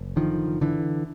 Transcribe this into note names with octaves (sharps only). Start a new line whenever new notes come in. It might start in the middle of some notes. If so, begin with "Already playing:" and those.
Already playing: F#1
D3 D#3 F3
F#1
D3 E3